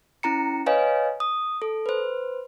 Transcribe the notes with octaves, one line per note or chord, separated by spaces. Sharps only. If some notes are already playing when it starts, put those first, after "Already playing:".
C#4 E4 A#5 C#7
B4 C#5 D#5 F5 G#5
D#6
A4
B4 C5